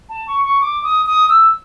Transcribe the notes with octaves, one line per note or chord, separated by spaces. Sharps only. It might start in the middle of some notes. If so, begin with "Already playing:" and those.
A5
C#6
C#6
D6
D#6
D#6
E6